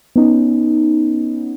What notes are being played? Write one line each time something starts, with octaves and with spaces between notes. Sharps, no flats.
B3 C#4 D#4